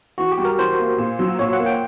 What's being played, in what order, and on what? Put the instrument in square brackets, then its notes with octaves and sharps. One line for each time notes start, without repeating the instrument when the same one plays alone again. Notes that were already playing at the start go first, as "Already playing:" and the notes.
[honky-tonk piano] E3 [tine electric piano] F#4
[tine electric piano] G4
[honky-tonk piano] G3
[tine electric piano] A#4
[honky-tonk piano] E3 [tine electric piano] C5
[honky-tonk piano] A#3
A#2
F#3
[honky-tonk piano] A#2 [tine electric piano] C#5
[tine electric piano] F#5
[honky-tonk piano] A#3
[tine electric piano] G5